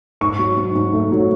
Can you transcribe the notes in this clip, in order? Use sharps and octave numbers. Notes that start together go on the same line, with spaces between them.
G#2 C#6
F#3
G#2
G#2
A3
F#3